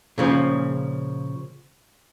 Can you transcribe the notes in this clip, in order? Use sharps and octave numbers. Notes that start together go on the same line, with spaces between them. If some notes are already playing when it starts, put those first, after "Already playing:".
A#2 C#3 F3